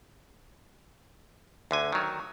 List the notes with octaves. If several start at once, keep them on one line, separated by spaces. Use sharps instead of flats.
D2 D3 G#5
D#3 F#3